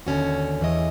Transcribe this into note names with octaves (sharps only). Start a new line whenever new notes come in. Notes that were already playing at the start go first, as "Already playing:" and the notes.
D#2 D3 C#4 F#4
E2 E3 D#5